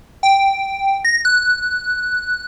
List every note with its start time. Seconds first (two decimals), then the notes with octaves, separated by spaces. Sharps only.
0.23 G5
1.05 A#6
1.25 F#6